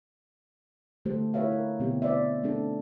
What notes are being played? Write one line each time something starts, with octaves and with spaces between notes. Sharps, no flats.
D3 A3 G4 A4 C5
E4 G4 B4 C#5 E5 F5
A#4
B2 D3 B3 C4 G4
C5 D5 E5
A3 C4 D4 D#4 A4